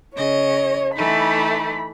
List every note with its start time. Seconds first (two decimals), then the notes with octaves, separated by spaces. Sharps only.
0.16 C#3 C#5 D#5
0.96 E3 A3 D#4 B5